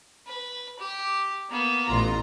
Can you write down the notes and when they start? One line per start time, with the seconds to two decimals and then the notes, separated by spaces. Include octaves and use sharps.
0.27 B4
0.79 G4
1.50 A#3 B3
1.87 A1 F4 A#5